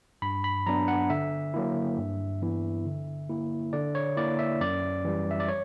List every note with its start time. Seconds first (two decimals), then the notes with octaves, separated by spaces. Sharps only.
0.22 G2 B5
0.44 B5
0.66 F#3 B3 D4 A#5
0.88 F#5
1.10 D3 E5
1.54 F#3 A#3 E4
1.98 G2
2.42 E3 B3 E4
2.85 D3
3.29 A#3 E4
3.73 D3 D5
3.95 C#5
4.17 A#3 E4 D5
4.39 E5
4.61 F#2 D5
5.05 E3 G3
5.31 E5
5.40 D5
5.49 C#5